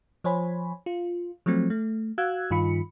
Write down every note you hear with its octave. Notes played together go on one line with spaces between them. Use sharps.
F3 C5 C#5 G#5 B5
F4
F3 F#3 A3 C4
A3
F#4 F5 E6 F#6 G#6
G2 D#3 F4 B5 C#7